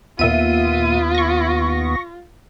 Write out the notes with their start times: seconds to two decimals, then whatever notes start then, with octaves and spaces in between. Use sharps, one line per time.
0.19 D#2 A#2 B3 F4 E5 D#7
1.15 C#6 A#6